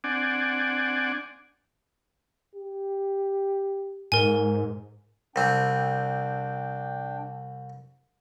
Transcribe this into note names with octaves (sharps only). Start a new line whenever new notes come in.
C4 D4 D5 F#5 G#5
G4
G#2 A#4 G#5
C2 C4 D4 G5